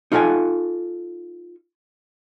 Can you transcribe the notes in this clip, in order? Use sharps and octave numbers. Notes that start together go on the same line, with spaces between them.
D#4 F4 A4 B4 F5 G#5